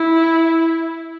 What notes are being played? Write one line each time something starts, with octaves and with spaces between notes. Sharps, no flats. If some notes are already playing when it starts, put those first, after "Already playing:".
Already playing: E4